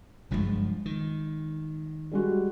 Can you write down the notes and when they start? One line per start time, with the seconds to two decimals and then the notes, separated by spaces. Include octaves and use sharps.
0.31 F#1 G2 F3 G#3 F4
0.85 D#3
2.12 G3 G#3 F#4